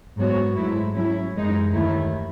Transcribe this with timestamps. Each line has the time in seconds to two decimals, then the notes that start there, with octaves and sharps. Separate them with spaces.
0.17 G#2 F#3 B3 F#4 C#5
0.56 G#2 F#3 A3 E4
0.95 F#3 C#4 E4
1.34 F#2 E3 G#3 D#4
1.72 D#2 D#3 A3 E4